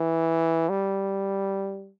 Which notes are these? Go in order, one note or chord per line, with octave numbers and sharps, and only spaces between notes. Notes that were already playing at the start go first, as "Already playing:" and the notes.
Already playing: E3
G3